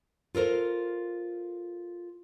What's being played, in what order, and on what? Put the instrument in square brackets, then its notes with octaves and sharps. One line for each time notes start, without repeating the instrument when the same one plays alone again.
[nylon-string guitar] F4 A4 A#4 C5